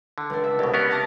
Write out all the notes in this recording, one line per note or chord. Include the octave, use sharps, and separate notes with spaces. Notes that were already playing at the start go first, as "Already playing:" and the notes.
D3
C#2 D4
E5
C2 B2 G4
B3 C#4 A#4
A5 D6 A#6